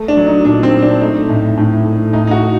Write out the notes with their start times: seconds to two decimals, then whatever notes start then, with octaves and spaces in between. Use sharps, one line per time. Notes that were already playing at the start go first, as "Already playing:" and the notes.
Already playing: A3
0.08 D4
0.17 F#3
0.26 D#4
0.45 A#2 D4
0.63 C4
0.74 A#2
0.82 D4
1.01 A3 D#4
1.29 A2
1.57 A2
1.84 A3
2.13 A2 D#4
2.27 D#4
2.31 F#4
2.41 A3